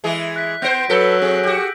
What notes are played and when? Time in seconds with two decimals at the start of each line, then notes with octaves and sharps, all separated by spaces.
0.04 E3 G#3 G#4
0.36 F#6 B6
0.62 B3 C5 G6 A#6 D7
0.90 F#3 A4 B4 E6 G6 B6
1.22 C4 G#4
1.43 F#4 G4